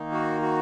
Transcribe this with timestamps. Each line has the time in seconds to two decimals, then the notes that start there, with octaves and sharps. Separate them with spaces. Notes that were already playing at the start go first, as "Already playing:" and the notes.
Already playing: D#3 A#3 D#4
0.12 F#4
0.42 F#4